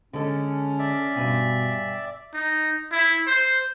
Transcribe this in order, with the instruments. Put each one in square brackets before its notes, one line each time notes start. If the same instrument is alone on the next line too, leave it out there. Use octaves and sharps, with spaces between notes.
[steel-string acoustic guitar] D3 G#3 A4 [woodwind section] C#4
[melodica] D5 E5
[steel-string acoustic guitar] G2 G#5 [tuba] B2
[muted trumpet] D#4
E4
C5